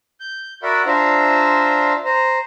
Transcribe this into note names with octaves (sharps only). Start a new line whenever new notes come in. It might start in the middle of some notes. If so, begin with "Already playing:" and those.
G6
F#4 A#4 D5 E5 F#5 B5
D4 F4 C5 E5 A#5
C5 A#5